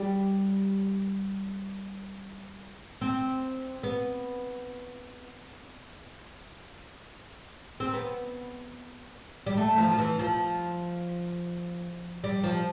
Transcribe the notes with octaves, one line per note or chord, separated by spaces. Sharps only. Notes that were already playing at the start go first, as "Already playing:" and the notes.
Already playing: G3
C4
B3
C4
B3
G3
A3
F3
F3
E3
F3
G3
F3